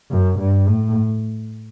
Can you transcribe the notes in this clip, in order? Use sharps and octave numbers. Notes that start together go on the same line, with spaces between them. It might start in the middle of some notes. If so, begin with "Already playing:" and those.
F#2
G2
A2